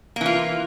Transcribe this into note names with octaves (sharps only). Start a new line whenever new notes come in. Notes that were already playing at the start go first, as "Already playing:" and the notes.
E3 A#3 F4